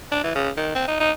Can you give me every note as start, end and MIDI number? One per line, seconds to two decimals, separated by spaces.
0.12 0.21 62
0.24 0.33 52
0.35 0.50 49
0.57 0.71 51
0.75 0.84 60
0.88 0.95 63
1.00 1.11 63